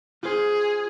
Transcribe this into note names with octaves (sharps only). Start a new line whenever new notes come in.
F4 G#4 C5